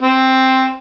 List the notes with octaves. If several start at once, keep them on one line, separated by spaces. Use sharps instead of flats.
C4